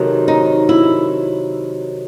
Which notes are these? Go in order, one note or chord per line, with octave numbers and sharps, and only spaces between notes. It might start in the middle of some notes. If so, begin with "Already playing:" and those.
Already playing: C3 D#3 F#3 A3
D#4
E4